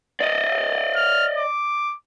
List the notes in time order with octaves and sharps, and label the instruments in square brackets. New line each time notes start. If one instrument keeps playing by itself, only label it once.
[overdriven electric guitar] D5 D#5
[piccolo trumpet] F6
D6